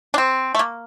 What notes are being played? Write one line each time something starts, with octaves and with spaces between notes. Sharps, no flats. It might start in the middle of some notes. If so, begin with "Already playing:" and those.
D4
C4
A3
A#3